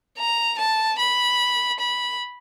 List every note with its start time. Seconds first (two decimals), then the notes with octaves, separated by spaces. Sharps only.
0.18 A#5
0.59 A5
0.99 B5
1.80 B5